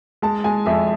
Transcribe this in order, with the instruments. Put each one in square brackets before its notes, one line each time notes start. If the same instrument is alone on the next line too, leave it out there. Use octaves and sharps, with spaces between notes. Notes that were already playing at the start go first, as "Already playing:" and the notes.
[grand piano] G#3 [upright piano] A5
[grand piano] G#3 [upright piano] G#5
[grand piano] F2 [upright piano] E5